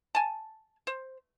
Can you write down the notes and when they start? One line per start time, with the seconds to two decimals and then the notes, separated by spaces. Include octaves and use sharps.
0.15 G#5 A5
0.87 C5